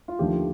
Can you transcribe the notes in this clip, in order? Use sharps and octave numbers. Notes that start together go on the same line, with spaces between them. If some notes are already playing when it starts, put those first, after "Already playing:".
F4
D#2 D3 F3 A3 G4